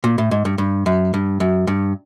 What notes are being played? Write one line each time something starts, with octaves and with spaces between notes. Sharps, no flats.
A#2
A2
G#2
G2
G2
F#2
G2
F#2
G2